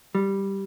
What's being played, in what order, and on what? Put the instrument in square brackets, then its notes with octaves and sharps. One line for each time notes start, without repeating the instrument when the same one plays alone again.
[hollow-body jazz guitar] G3